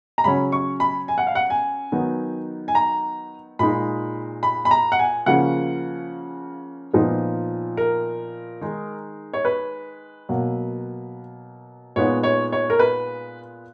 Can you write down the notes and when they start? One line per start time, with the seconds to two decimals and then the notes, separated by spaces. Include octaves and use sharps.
0.18 A#5
0.24 C#3 F#3 C#4 B5
0.52 C#6
0.80 B5
1.08 G#5
1.18 F#5
1.27 F5
1.35 F#5
1.50 G#5
1.92 D#3 F#3 B3 D#4
2.68 G#5
2.75 A#5
3.59 A#2 G#3 D#4 B5
4.43 B5
4.65 B5
4.71 A#5
4.92 F#5
4.99 G#5
5.26 C#3 F3 A#3 C#4 F#5
6.93 A#2 F3 B3 D#4
7.77 A#4
8.61 D#3 G#3 D#4
9.33 C#5
9.45 B4
10.29 B2 F#3 A#3
11.96 A#2 G#3 B3 D#4 C#5
12.23 C#5
12.52 C#5
12.70 A#4
12.79 B4